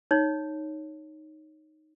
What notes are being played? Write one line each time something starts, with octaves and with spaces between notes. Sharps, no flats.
D#4 C#5